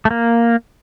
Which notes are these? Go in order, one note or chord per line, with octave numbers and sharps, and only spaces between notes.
A3
A#3